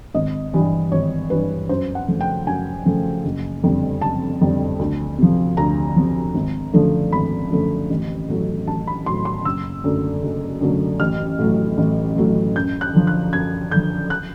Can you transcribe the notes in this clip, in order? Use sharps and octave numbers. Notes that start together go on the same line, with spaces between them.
G#1 D#5
G2 E3 G3
G#1 C#5
G2 E3 G3 B4
F#2 C5
F#5
C#3 F3 A3
G5
F#2 G#5
C#3 F3 A3
F#1
F2 D3 G3
F#1 A5
F2 D3 G3
D2
C3 F3
D2 A#5
C3 F3
G#1
F#2 D3 F3 A3
G#1 B5
F#2 D3 F3 A3
A1
A2 F#3 A3
A1 A5
B5
A2 F#3 A3 C6
C6
F#1 E6
F#2 D3 F#3 A3
F#1
F#2 D3 F#3 A3
A1 F6
A2 F#3 A3
A1
A2 F#3 A3
F#2 G6
F#6
D3 F3
F#6
F#2 G#6
D3 F3 G6
F#6